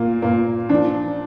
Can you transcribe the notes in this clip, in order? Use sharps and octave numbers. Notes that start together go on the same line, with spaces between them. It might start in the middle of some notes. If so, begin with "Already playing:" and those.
Already playing: A#2 A#3
A#2 A#3
F3 D4